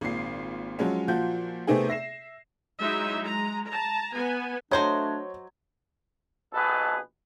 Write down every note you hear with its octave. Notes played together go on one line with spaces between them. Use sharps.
G#1 A#2 C7
F3 F#3 G#3 C#4
A#2 F3 F#4 G6
C3 A3 B3 C4 D#4 G#4
E5 A#6 C7 E7
F#3 G#3 D#4 E4 E5
G#3 A#5
A5 A#5
B3 G#5
F#3 A3 D4 C5 C#5 D#5 G#6
A#1 B2 D#4 G#4 A4 B4